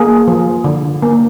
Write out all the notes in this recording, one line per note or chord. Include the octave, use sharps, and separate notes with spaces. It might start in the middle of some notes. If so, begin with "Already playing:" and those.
Already playing: A#3 G#4
F3
D3
A#3